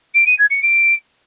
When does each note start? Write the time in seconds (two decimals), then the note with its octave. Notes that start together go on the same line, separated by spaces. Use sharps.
0.14 D7
0.26 D#7
0.38 G#6
0.50 C#7
0.62 D7